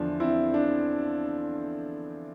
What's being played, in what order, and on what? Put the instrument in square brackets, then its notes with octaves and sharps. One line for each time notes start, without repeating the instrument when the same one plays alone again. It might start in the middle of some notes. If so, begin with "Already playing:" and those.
Already playing: [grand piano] E2 D3 F3 D4
C4 E4
D4